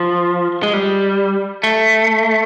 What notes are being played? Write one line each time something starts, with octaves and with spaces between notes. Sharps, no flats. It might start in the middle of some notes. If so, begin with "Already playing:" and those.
Already playing: F3
G#3
G3
A3